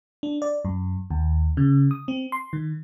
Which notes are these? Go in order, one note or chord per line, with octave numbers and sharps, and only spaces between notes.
D4
D5
F#2
D#2
C#3
D#6
C4
C6
D#3